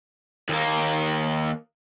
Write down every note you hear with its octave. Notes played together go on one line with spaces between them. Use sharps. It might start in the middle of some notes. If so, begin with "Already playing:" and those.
D#2 A#3